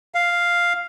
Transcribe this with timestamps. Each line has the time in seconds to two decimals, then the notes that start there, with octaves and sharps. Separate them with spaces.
0.15 F5